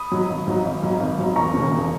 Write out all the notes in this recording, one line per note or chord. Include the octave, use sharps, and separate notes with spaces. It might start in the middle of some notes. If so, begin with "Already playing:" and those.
Already playing: B5 D#6
G#2 F#3
G#1
G#2 F#3
G#1
G#2 F#3
G#1
G#2 F#3
E1 A#5 C#6
D#2 C#3
E1